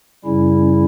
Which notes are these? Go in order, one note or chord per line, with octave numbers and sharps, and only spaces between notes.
F#2 C#3 G3 C#4 E4